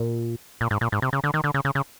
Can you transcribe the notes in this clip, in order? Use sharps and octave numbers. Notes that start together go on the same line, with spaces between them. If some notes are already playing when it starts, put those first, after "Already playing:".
Already playing: A#2
A#2
G#2
A#2
G#2
C3
C#3
D3
D#3
D3
C#3
C#3
C#3